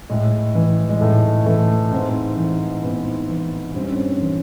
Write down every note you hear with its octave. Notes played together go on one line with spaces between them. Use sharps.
A2 G#3
E3
G#3
A2 A3
E3 A3
G#2 C4
E3
G#2 B3
E3
G2 C4
C#4
C4
E3